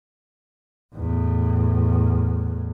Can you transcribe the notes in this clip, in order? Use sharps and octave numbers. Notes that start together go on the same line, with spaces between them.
E2 A2